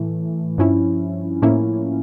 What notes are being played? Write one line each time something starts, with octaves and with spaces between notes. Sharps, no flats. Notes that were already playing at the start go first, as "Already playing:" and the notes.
Already playing: A2 E3 A3
G2 F3 C#4 E4
A2 F3 A#3 C#4 E4